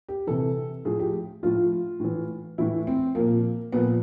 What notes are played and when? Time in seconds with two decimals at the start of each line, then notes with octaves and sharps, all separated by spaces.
0.09 G4
0.27 C3 E3 A4
0.85 A2 F3 G#4
0.99 G4
1.43 A2 F3 F4
2.00 A2 E3
2.58 A2 E3 E4
2.87 C4
3.15 A#2 F3 A#3
3.72 A#2 F3 B3